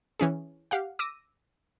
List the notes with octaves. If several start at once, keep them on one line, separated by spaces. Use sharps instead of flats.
E3 C#4 G#4
G4 F5 F#5
D6 E6 A#6 D#7